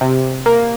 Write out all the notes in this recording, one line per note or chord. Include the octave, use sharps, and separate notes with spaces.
C3
A#3